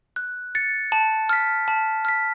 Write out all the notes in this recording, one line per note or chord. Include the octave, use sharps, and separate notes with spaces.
F#6
A6 C#7
A5
F6 B6
A5
F6 B6